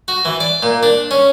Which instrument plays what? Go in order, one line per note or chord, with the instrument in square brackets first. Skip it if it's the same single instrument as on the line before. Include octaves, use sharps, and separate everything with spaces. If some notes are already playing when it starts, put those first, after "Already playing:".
[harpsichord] F#4
E3
D5
A#2
D4
C#4